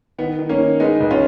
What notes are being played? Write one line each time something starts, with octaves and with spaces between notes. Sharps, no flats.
D#3 B3
D#3
A#3 C#4
D#3
G#3 B3 D#4
C#2
C#4 F4